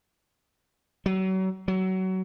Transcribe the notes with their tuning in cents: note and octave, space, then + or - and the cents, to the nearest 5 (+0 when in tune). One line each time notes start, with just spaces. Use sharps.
F#3 +35
F#3 +25